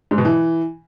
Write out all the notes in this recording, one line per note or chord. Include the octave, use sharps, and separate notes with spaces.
G#2
B2
E3